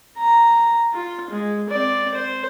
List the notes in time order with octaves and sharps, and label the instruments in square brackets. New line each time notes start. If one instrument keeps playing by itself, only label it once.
[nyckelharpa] A#5
F4
G#3
C4 D5
C5